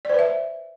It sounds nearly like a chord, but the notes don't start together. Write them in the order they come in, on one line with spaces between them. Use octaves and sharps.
D5 C5 B4 E5